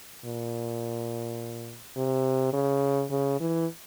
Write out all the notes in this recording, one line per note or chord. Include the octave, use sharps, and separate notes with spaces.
A#2
C3
C#3
C#3
E3